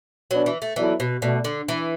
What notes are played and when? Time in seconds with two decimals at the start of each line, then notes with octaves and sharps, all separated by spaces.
0.31 B2 F#3 B3 D4 B4 D5
0.46 E3
0.62 A3
0.76 E3 F#3 B3 E4 A4 D5
1.00 B2
1.22 B2 A3 F#4 D5
1.44 D3
1.68 E3